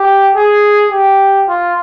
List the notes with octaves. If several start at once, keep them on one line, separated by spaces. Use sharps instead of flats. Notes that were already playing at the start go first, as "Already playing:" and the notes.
Already playing: G4
G#4
G4
F4